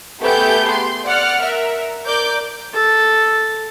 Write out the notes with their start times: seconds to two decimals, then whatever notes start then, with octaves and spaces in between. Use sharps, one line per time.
0.21 A3 B3 G4 G#4 G6
0.70 C6
1.07 D5 F#5 F6
1.42 A#4 E5
2.05 A#4 D5 D6 G6
2.74 A4